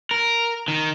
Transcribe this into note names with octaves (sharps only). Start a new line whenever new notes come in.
A#4
D#3